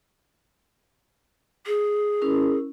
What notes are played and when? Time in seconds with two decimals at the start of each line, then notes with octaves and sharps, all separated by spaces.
1.67 G#4
2.22 C#4 E4 A#4